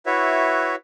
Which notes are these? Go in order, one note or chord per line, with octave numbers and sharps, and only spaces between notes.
E4 F#4 B4 C#5 E5